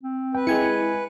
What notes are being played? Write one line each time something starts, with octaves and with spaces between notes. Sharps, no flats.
C4
B4 G5
G#3 E4 G#5 C#7